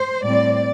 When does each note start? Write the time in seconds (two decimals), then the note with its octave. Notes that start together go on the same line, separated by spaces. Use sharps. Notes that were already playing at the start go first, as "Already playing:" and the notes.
Already playing: C5
0.24 A2 G3 C4 D5